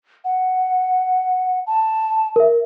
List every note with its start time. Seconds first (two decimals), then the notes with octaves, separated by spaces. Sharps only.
0.25 F#5
1.67 A5
2.36 A#4 E5